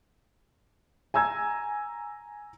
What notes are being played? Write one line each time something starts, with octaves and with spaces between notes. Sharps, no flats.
G#5 A#5 E6 G#6